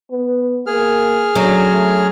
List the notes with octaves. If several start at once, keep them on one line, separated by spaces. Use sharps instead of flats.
B3
A#3 G#4 F6
D3 F#3 C#4
A3